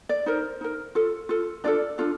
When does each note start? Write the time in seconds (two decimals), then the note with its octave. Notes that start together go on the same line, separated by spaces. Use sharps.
0.09 D5
0.26 D#4 A#4 C5
0.61 D#4 A#4
0.95 F4 A4
1.29 F4 A4
1.64 D4 F4 A4 D5
1.98 D4 F4 A4